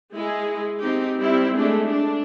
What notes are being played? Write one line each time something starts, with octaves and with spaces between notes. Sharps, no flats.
G#3 E4 G#4
C4 D#4 G4
G3 C4 E4
G#3 A3 D4
D4